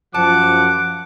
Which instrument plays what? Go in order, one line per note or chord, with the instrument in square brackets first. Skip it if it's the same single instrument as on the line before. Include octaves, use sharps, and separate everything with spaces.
[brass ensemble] F#2 F3 [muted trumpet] F#5 [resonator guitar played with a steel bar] A5 [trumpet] D6